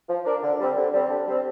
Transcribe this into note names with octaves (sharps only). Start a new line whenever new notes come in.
F3
D4 A#4 D5
D3
G3 C4
D3
G3 C4
D3
G3 C4